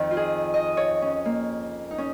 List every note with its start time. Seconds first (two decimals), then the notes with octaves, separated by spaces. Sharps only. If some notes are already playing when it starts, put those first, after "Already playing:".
Already playing: F2 D#3
0.11 F4
0.17 G#4
0.54 D#5
0.77 C#5
1.02 C#4
1.26 A#3
1.91 D#4
1.98 C#4